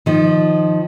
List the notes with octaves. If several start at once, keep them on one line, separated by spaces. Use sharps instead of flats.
D#3 F3